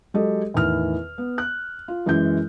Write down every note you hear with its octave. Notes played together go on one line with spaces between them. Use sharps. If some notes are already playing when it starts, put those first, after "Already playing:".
F#3 G#3 G4 A4 D#5
E2 A2 D#3 F6
B3
F#6
F4
F#2 E3 G#3 G6